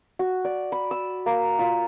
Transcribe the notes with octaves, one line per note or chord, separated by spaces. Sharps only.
F#4
D5
B5
E6
A#3
F4